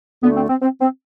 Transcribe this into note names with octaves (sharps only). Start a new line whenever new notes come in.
D2 D3 A3 B3
C4
C4
C4
C4